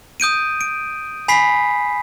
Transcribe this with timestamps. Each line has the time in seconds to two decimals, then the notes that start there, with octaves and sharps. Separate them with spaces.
0.20 D#6 G6 D7 D#7
0.61 D7
1.28 G#5 B5 B6 C7